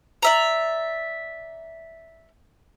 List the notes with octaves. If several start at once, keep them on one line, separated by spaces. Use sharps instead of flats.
D5 E5 A#5